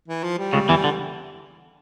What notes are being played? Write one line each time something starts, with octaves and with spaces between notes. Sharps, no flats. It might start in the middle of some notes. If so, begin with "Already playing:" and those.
E3
F3
G3
C#2 C#3
E2 E3
D3